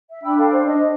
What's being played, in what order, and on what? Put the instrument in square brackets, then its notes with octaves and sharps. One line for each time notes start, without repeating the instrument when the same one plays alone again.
[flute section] E5
[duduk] D4 [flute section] G5 B5 E6
[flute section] A4 F5 G5
C5
[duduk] D4 [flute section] D#5